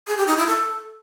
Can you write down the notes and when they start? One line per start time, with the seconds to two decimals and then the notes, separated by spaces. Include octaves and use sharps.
0.07 G#4
0.17 G4
0.27 D#4
0.37 E4
0.47 A4